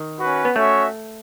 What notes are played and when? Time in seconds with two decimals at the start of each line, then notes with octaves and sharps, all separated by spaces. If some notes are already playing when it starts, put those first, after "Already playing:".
Already playing: D#3
0.18 C#4 F#4 B4
0.45 B3
0.55 A3 C#4 F#4 C#5 E5